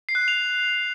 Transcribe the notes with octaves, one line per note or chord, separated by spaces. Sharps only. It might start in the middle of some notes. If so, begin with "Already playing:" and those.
C7
F#6
C7
F7